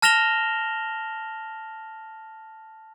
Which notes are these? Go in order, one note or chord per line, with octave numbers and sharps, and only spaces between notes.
A5 F6 A#6 E7 F7 G7